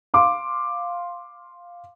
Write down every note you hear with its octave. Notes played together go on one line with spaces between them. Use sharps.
F5 C6 D6